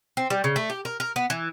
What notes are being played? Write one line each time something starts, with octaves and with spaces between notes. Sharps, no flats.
C4
G3
C#3
A3
G4
A#4
A#4
B3
E3